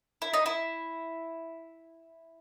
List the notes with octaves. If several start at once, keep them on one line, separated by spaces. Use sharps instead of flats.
E4
D#4
E4